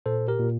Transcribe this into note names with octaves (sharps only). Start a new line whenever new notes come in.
A#2 A4 C5
G4 A#4
A#2